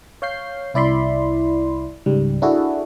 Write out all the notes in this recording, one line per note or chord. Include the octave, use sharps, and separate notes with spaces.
C#5 F5 G6 C7
C2 E4 D5 B5 C6
C#2 G#2 G3
D4 E4 F#4 G#4 A4